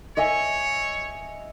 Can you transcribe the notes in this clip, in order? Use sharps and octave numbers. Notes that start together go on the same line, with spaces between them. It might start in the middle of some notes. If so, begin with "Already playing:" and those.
C#5 D#5 E5 G#5